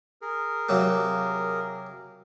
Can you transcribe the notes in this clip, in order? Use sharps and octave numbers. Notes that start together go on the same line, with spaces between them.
G#4 A#4
C3 F#3 A#3